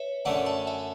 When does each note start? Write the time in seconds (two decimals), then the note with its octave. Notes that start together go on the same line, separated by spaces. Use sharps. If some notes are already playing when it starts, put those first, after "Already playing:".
Already playing: B4 C#5 E5
0.25 F#2 D3 A3 C#4 D5 F#5
0.46 F#5 A5
0.67 E5 G#5